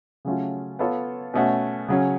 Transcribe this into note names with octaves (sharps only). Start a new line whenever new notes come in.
C#3 F#3 A3 C#4 F4
B3 F4 A4 C#5
B2 A3 C#4 F#4
C#3 F#3 C#4